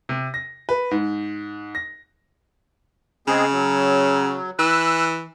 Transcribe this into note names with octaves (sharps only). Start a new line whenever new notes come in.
C3
A#6
B4
G#2
A#6
C#3 G#3 C4 G#4
F#3
E3 E6 F#6